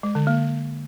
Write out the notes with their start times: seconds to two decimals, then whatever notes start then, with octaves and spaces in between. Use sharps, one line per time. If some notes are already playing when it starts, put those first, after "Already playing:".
0.03 G#3
0.15 D3
0.27 A#3